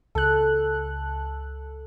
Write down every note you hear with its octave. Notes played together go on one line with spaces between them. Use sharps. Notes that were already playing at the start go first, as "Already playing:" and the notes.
C#2 A4 F#6